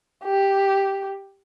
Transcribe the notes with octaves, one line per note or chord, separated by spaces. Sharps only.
G4